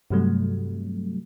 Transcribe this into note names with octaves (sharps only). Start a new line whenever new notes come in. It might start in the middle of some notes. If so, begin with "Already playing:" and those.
G2 C3 F#3 G3 A3